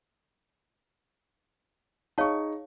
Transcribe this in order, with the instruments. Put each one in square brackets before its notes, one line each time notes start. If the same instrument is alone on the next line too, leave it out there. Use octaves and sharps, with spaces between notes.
[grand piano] D#4 G#4 C#6 [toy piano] C#5 F5 A5